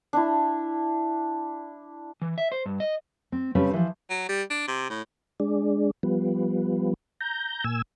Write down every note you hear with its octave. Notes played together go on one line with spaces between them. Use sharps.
D4 E4
E3
E5
C5
G2
D#5
C4
C#3 G3 C4 C#4 A4 B4
E3 F3
F#3
G3
D4
C3
A2
G#3 D4
F3 G3 B3
A#5 G6
A#2 G#5 E6